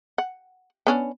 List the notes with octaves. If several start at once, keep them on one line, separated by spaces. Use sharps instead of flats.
F#5
B3 C#4 D4